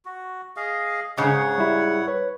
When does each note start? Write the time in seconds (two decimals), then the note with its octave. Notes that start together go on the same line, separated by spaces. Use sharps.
0.05 F#4
0.57 G#4 D#5 F5
1.17 G#2 C#3 C#5 F#5
1.58 G3 E4
2.08 B4 C#5